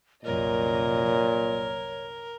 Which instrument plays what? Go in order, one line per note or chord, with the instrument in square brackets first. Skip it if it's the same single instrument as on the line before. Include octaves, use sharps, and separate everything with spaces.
[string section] C2 F#2 D#5 [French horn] A#2 [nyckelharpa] A#4 [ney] C#5